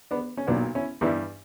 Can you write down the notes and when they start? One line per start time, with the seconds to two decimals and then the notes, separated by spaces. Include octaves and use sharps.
0.11 B3 D4
0.37 C#4
0.47 B1 A#2 F#3 B3 D4
0.75 C#4 E4
1.01 G2 E3 G3 E4 G4